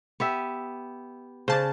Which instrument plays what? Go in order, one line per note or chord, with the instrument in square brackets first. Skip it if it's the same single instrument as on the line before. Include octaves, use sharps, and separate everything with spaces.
[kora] B3 G4 E5
[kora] C#3 D5 [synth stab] C5 A5